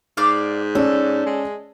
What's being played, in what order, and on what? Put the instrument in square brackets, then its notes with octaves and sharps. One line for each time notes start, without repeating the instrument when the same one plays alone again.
[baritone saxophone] G#2 [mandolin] D5 F5
[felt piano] C#4 D5 [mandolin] A4
[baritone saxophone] G#3